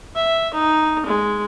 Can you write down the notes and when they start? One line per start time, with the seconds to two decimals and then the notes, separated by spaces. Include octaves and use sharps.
0.16 E5
0.54 D#4
1.06 G#3